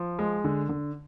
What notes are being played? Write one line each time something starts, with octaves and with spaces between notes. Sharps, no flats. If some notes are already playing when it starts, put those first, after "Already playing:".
Already playing: F3
G#3
D3
D3